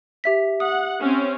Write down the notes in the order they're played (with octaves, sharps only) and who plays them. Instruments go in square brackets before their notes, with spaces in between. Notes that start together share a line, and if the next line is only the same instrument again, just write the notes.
[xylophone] G4 E5 B6
[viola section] F#5 [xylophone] D#6
[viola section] C4 C#4